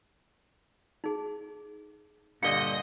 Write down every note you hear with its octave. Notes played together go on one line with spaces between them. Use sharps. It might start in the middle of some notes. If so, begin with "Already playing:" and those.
D#4 G#4
G2 A#2 D3 D#5 F5 D#6 C#7 G7